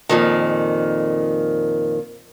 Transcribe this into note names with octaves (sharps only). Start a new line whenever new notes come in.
F2 A#2 D#3